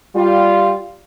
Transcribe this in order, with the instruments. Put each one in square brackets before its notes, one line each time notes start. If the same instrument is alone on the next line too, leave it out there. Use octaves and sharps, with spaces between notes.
[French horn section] G3 F4